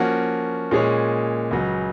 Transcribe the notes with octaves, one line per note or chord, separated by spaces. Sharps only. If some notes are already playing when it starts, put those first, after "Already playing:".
Already playing: F3 A#3 C#4 F#4
A#2 G#3 C#4 G#4 C#5
C#2 C#3 F#3